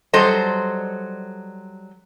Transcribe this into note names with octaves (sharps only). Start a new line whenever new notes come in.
F#3 G3 A4 C5 D#5